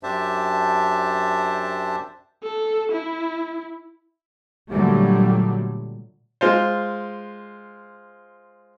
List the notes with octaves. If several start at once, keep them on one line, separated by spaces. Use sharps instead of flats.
F#2 D4 G4 C5 E5 A5
A4
E4
A#2 D3 F#3 G3 A3
G#3 F4 C5